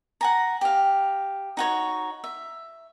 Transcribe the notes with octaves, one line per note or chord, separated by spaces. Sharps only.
F#5 G#5 A#5
G4 F5
D#4 F#4 C#5
E5